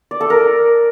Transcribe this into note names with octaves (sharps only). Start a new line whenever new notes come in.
D5
A4
A#4